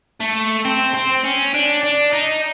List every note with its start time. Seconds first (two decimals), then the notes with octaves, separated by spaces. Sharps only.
0.20 A3
0.65 C4
0.94 C4
1.24 C#4
1.54 D4
1.83 D4
2.13 D#4